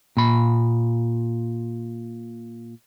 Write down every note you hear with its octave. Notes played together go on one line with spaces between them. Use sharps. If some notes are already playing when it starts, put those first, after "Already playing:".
A#2 B5